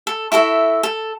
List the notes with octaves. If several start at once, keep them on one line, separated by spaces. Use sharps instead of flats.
A4
E4 F#4 A4 E5
A4